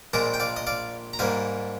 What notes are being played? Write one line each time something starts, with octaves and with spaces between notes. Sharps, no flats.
A#1 A#2 G#3 A#4 D5
G5
D5 F5
D#5
D5 F5
A#5
G#2 G3 A#3 F5 G#5